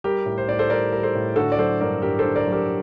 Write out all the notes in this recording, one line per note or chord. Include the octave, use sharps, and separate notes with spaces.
G3 G4 A#4
A2
C5
A2 D5
A4 C5
G3 A#4 D5
G3 A#4
A4 C5
A2
D3 F#4 A4
D5
F#3 A4 C5
G2 A#4 D5
G2 G4 A#4
A4 C5
D3
A#4 D5
F#3
G4 A#4